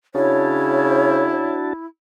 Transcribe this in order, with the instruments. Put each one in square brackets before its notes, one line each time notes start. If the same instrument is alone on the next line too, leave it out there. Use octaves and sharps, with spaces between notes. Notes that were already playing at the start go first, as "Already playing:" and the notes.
[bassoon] C#3 [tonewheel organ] D4 F#4 A5 [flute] E4 [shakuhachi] C#5